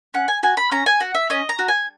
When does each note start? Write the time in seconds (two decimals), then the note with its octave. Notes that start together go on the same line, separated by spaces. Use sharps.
0.14 C#4 F#5
0.28 G#5
0.43 F#4 G#5
0.57 B5
0.72 C#4 A#5
0.86 G#5
1.00 F#4 F#5
1.15 E5
1.30 C#4 D#5
1.49 A#5
1.59 F#4
1.68 G#5